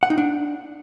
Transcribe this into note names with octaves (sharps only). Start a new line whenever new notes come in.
F#5
D#4
D4